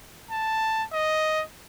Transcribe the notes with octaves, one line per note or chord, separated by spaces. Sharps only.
A5
D#5